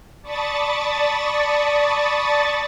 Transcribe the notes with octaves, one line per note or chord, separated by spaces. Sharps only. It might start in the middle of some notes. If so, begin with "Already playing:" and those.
D5 A5 B5 C#6 D#6 A6